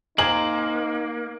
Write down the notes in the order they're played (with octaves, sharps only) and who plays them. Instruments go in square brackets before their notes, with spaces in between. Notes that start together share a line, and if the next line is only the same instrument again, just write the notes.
[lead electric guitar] A#3 [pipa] C4 G#4 A#5 [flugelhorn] D#4 [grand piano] F#7